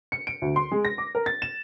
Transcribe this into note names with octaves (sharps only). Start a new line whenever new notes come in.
C#7
D7
D2
C6
G#3
A#6
D6
A#4
A6
E7